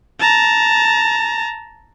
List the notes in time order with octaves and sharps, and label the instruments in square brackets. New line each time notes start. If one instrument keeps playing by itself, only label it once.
[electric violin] A5 A#5